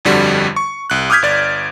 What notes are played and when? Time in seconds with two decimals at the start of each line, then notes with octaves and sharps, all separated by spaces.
0.05 G1 F2 D3 G3 F#4
0.56 C#6
0.90 C2 F#6
1.10 D6 D#6 F6 G6 G#6 B6
1.22 G1 D5 A6